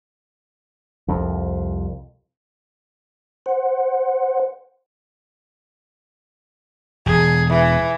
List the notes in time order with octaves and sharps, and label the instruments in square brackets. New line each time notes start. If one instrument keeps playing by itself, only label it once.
[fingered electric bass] C2 F2
[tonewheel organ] C5 F#5
[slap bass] E1 [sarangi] G#4
[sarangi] E3